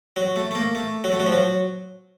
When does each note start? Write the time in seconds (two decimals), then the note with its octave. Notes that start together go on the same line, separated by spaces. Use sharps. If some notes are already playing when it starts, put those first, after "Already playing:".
0.16 F#3
0.36 A3
0.51 A3
0.55 A#3
0.75 A3
1.04 F#3
1.12 A3
1.20 F#3
1.26 F3
1.32 F#3